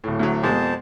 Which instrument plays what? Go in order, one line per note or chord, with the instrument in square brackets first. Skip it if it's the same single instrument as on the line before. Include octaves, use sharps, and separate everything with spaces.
[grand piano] D1 A2
[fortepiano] D2 F#3
[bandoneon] F2 C5 A5 [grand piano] B2 [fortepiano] G#3 A#3 G4